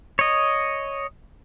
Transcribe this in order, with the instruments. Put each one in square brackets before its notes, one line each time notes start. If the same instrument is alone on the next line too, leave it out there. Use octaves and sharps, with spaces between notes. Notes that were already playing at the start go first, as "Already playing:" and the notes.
[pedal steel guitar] C#5 D#5